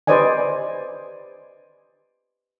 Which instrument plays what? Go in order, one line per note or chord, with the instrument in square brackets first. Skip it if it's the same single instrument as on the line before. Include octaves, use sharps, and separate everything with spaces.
[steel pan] G4 B4 C5 D5 D#5 G#5